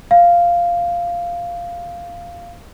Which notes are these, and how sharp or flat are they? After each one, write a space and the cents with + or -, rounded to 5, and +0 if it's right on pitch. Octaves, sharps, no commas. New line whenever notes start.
F5 -5